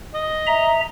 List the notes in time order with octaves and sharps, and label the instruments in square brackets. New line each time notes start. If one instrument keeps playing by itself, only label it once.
[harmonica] D#5
[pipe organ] E5 A#5